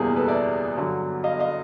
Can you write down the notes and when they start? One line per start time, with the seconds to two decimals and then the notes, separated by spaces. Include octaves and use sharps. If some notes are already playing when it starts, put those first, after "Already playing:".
Already playing: F#1 E2 B2 G3 A#3 G#4
0.16 A4 B4
0.28 D5 E5
0.76 G2 D3 F#3
1.24 D#5 F5
1.39 D#5 F5